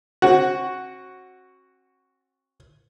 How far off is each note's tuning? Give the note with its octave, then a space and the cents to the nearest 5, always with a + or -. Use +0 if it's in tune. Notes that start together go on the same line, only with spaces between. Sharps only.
C4 +40 F#4 +0